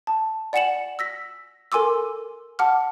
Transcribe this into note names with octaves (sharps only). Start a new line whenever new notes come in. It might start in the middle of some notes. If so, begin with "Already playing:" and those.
A5
D5 F#5 G#5 C#7 E7 F#7
E6 A#6 B6
A4 A#4 G#5 C6 D6 E6
F#5 A5 D6 F6